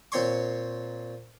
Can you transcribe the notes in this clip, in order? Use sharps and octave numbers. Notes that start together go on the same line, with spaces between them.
A#2 C4 C#5 C6 C#6